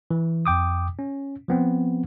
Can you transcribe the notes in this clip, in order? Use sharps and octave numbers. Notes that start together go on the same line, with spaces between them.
E3
F2 G5 D6 D#6
C#4
F3 B3 C4